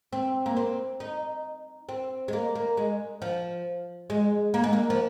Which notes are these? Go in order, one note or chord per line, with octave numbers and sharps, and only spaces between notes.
C4
A#3
C4
D#4
C4
G#3
A#3
A#3
G#3
F3
G#3
A#3
G#3
A#3
F3